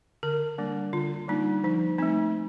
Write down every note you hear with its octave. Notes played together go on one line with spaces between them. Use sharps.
D3 A#4
G3 A#3 D4
D3 F4
G3 A#3 D4 D#4
F3 D#4
A3 C4 D#4